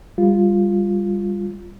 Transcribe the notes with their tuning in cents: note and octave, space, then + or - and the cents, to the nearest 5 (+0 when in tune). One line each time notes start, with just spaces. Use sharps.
G3 +25 F4 +0